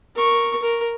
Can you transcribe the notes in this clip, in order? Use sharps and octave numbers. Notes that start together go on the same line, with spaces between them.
A#4 C#6
A#4